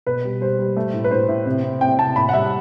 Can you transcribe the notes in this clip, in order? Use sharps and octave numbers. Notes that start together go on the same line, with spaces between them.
B2 B4
G3
G3 C5
G3
A3
A2
B4
A2 C5
A2
C3
C3
C3 G5
C3 A5
A2 B5
F#5
G3 E5